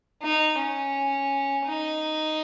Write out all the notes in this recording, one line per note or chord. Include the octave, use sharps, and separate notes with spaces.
D#4
C#4
D#4